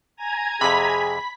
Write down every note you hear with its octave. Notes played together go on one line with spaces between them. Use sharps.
G#5 A#5 G#6
F2 C3 G#4 B5 B6